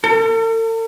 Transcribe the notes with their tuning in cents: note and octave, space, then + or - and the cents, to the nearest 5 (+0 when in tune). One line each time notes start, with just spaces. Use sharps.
A4 +45